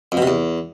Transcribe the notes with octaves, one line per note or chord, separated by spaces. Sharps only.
F2
B2
C3
E2